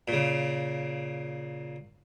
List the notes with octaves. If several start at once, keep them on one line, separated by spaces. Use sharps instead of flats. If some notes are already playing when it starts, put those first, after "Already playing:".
A#2 C#3